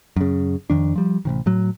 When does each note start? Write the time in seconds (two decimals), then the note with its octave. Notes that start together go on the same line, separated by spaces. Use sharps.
0.16 F#2 C#3
0.70 F2 D#3 D4
0.96 F3 G3
1.25 A1 C3 D#3
1.46 A2 F#3